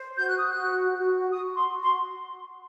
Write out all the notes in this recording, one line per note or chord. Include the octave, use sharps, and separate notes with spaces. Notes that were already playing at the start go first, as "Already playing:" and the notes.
Already playing: C5
F#4 G6
F#6
D#6
F#6
F#4
F#4
F#4 D#6
C6
F#4
C6